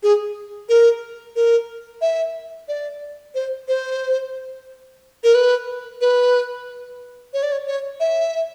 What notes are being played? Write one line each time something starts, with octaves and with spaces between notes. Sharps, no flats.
G#4
A#4
A#4
E5
D5
C5
C5
A#4
B4
B4
C#5
D5
C#5
C#5
E5